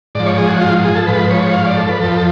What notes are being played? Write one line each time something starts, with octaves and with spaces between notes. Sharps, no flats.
G#2 F3 D5
C#5
G#4
F#4
F4
G#4
A4
G#2 F3 B4
C#5
F5
D5
A4
B4
F2 F3 A4
A4